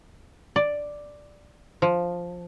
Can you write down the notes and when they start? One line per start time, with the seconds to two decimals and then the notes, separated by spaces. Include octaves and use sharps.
0.56 D5
1.82 F3